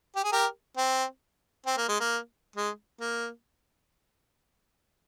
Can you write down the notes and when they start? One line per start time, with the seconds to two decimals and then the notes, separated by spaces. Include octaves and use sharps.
0.16 G4
0.24 G#4
0.32 G4 A#4
0.77 C4
1.66 C4
1.77 A#3
1.89 G#3
2.00 A#3
2.56 G#3
3.01 A#3